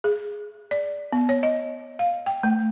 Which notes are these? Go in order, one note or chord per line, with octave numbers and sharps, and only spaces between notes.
G#4
D5
B3
C#5
D#5
F5
G5
A3